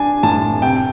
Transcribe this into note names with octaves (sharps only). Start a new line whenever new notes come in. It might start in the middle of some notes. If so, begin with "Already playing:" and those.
Already playing: D4 G#5
A2 A5
C3 G5